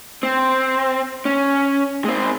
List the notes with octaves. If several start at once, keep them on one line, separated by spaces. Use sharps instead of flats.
C4
C#4
G#3 C4